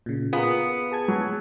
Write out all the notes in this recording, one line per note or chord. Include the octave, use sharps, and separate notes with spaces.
A#2 C#3
B3 F4 G#4 A#4
G#4 A5 G#6
F#3